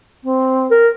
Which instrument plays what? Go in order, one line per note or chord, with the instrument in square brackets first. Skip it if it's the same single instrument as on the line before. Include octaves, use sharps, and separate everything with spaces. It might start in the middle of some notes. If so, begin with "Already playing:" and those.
[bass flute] C4
[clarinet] A#4